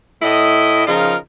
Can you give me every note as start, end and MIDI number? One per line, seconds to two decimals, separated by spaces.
0.22 0.84 45
0.22 0.84 57
0.22 0.84 64
0.22 0.84 75
0.86 1.15 49
0.86 1.15 53
0.86 1.15 63
0.86 1.15 65
0.86 1.15 70